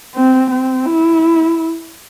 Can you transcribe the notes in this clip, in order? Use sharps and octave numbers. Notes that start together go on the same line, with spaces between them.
C4
C4
E4